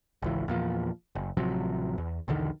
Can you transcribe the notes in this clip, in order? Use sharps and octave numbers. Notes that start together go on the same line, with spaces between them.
G#1 C#2 E3
E2 A#2 F3
F#1
A1 C3 F3 F#3
E2
B1 E2 D3 D#3